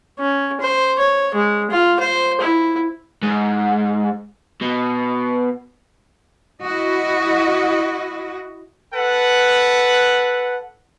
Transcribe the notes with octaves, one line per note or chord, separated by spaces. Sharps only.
C#4
C5
C#5
G#3
F4
C5
E4
G#2
B2
E4 F#4 D#5
A4 B4 F#5